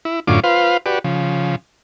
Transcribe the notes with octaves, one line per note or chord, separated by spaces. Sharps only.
E4
F#2 A2 D3 C#4 F4 D6
F4 B4 C5 F5
F#4 G4 B4 D5
C#3 F3